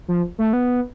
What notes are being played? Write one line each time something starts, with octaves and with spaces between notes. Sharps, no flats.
F3
A3
B3